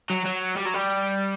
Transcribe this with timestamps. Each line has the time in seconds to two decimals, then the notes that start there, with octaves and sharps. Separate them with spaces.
0.10 F#3
0.25 F#3
0.57 G3
0.66 F#3
0.74 G3